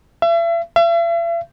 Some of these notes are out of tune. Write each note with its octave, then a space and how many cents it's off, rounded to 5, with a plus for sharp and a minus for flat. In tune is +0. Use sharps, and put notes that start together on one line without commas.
E5 +40
E5 +45